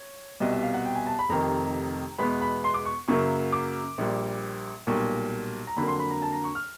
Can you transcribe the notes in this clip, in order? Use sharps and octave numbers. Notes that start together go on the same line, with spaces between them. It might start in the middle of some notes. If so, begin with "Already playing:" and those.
Already playing: C#5
C2 B2 G3 D#5
E5
F5
F#5
G5
G#5
A5
B5
F1 F2 C3 D#3 A#5
E2 B2 G#3 B3 B5
B5
C6
D6
C#6
F#2 C#3 F#3 A#3 C#6
D6
A#1 A#2 G3
B1 A#2 G3 A#3 C#6
A#5
F2 D3 F#3 A#3 B5
C6
B5
A#5
A5
A#5
C#6
F6